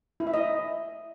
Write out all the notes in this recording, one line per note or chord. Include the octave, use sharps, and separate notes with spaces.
E4
E5
D#5